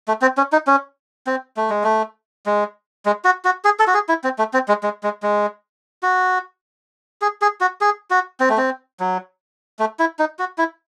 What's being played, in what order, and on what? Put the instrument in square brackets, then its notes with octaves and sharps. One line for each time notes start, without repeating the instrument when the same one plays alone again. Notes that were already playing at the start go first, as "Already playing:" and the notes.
[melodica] A3
C4
C#4
D#4
C#4
C4
A3
G#3
A3
G#3
G#3
F#4
F#4
G#4
A4
F#4
G#4
E4
C4
A3
C4
G#3
G#3
G#3
G#3
F#4
G#4
G#4
F#4
G#4
F#4
C4
A3
C4
F#3
A3
E4
D#4
F#4
E4